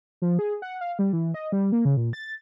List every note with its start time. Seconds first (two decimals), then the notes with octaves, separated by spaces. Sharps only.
0.22 F3
0.39 G#4
0.62 F#5
0.81 F5
0.99 G3
1.13 E3
1.34 D#5
1.52 G3
1.72 A#3
1.85 C#3
1.97 A#2
2.13 A6